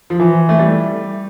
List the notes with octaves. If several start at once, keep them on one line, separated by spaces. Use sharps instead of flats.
F3
E3
A3
G3